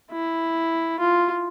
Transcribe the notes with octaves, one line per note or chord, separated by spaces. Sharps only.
E4
F4